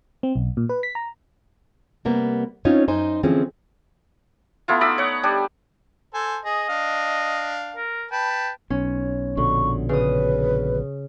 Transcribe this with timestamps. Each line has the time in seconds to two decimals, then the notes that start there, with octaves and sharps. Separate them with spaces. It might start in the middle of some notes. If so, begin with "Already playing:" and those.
0.23 C4
0.36 B1
0.57 A#2
0.69 B4
0.83 B6
0.95 A#5
2.05 C3 G3 A#3 B3
2.65 C4 C#4 D#4 F4 C#5
2.88 F#2 D#4 C5 G#5
3.23 D3 E3 F3 C4 C#4 G#4
4.68 A3 B3 E4 F4
4.81 D#4 D5 B5 E6
4.98 C#5 F#5
5.23 G3 D4 G4
6.14 A4 C5 G#5
6.45 G#4 D#5
6.69 D4 F5
7.76 A#4
8.11 B4 G5 A5
8.70 B1 C#4
9.37 A#1 B2 D3 C#6
9.89 C#3 B4 D#6